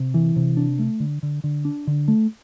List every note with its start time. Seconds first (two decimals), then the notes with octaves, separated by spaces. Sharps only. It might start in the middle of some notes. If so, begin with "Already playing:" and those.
Already playing: C3
0.14 E3
0.36 C3
0.57 D4
0.79 A3
1.00 D3
1.23 D3
1.44 D3
1.65 D4
1.87 D3
2.08 A3